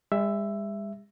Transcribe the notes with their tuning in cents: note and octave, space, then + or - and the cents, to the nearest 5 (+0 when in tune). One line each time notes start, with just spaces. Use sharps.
G#3 -45 E5 +10